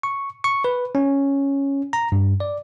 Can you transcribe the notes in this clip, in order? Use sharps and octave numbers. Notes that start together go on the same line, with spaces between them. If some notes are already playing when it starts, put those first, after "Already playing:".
C#6
C#6
B4
C#4
A#5
G2
D5